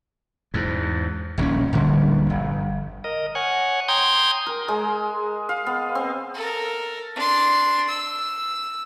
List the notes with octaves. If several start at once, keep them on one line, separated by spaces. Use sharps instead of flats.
E2 G#2
D#1 A#1 A2 C#4
D1 A#1 D3 G3
G1
A#4 D#5
C#5 F#5 G#5
G5 A#5 C6 D#6 G6 G#6
A#4
G#3
F5
B3
C4
A4 A#4
D4 C6
E6